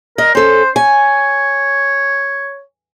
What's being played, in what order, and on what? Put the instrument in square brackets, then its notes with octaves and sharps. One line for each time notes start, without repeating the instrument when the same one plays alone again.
[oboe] A#4 [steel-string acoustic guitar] D#5
[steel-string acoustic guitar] C#4 A4 [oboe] C5
[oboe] C#5 [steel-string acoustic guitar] G#5